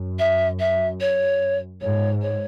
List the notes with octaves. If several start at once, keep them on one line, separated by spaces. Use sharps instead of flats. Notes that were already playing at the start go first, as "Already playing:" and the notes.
Already playing: F#2
E5
E5
C#5
G#2 C#5
C#5